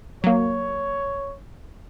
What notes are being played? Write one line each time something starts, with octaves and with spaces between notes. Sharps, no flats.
F#3 A#3 C#5